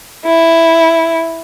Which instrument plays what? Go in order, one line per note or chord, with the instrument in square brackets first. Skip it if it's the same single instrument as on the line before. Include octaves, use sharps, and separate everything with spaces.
[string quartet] E4